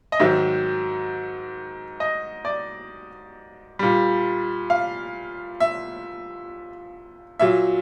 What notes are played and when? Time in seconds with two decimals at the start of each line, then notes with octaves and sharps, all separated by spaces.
0.12 D#5
0.19 G#2 D#3 F#3 E5
2.00 D#5
2.45 D5
3.79 A#2 G3
4.70 F5
5.60 E5
7.39 A#2 F#3 E5